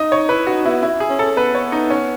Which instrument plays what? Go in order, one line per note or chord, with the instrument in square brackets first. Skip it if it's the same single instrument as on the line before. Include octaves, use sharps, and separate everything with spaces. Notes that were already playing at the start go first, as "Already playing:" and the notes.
Already playing: [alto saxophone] D#4 [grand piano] D#5
[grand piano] C#5
[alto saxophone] E4 [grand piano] B4
[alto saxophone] D#4 [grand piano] F#4
[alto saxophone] B3 [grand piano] E4
[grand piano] E4
G#4
[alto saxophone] C#4
[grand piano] A4
[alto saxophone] B3 [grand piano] B4
[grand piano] C#5
D#4
C#4